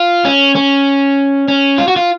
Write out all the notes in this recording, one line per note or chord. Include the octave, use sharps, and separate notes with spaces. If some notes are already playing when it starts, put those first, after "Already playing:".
Already playing: F4
C#4
C#4
C#4
F4
F#4
F4